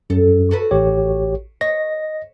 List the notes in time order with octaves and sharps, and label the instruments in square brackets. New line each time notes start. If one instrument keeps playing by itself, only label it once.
[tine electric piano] F#2 [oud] A4
[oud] F#4 A4 B4
[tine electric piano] A1 G4 C#5
[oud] C#5 [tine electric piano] D#5 A#6